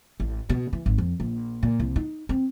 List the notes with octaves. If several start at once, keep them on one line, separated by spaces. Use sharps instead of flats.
A1
B2
E3
G#1
F2
A#1
A#2
C2
D#4
C4